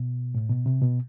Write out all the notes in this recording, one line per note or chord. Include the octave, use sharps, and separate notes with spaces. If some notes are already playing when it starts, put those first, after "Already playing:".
Already playing: B2
A2
B2
C3
B2